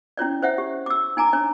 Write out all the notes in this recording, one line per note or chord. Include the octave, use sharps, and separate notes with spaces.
C#4 E4 C#5 D5
C5 C#5 E5 F#5
G4
D6 E6
D#4 G#5 A#5 D6
D4 C#5